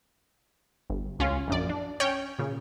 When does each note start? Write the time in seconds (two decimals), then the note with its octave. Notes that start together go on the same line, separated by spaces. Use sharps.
0.90 G1
1.19 C#2 C#4 F4
1.48 A#1 F#2 D5
1.69 D4
2.00 C#4 C#5 G5
2.39 A#2 C#3